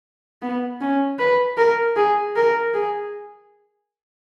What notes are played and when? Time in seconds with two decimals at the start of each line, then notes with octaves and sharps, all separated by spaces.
0.42 B3
0.81 C#4
1.19 B4
1.57 A#4
1.96 G#4
2.36 A#4
2.74 G#4